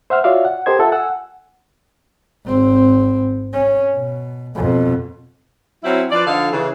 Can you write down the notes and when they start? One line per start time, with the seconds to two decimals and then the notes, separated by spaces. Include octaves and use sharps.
0.10 C5 E5 F#5 F6
0.24 F4 F#4 C#5 D5 E5 F5
0.45 F#5
0.66 G4 A4 A#4 C5 D#5 G#6
0.79 F4 A4 E5 F#5
0.92 F#5 G#5 E6
2.45 G#1 C4
3.53 C#4
3.93 B2
4.55 F2 B2
5.83 F#3 C4 C#4 E4
6.11 F3 B4 D5
6.27 D3 F3 D#4 A4 F5
6.52 C#3 E3